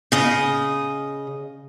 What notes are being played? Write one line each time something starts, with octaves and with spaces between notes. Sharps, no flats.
C#3 D#5